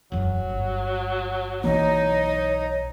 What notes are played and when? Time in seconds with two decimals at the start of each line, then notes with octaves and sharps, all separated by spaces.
0.12 E1 F#2 F#3
0.49 G1
1.64 B1 E3 A#3 D#4 C#5